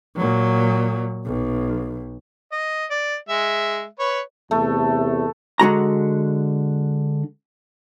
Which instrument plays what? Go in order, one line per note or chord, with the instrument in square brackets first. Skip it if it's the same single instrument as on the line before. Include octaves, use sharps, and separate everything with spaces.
[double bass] A#2 F#3
B1
[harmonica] D#5
D5
G#3 E5
B4 C#5
[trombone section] E2 C3 [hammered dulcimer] A3
[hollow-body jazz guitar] D3 G#3 F#4 A#5